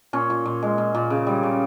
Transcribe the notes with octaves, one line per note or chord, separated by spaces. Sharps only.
A#2 C#4
A#2
A#2
G#3
A#2
A#2
C#3
G3
C#3